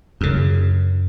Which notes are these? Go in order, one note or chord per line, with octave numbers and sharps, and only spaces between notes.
F#2 C#3